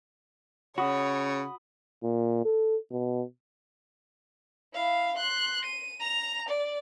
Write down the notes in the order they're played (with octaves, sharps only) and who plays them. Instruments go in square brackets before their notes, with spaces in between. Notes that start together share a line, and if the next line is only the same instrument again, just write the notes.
[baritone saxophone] C#3 [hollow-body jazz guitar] F#4 [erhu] C#5 [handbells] B5 D#6
[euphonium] A#2
A4
B2
[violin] E4 F5
C6 F#6
D#7
A#5 F7
D5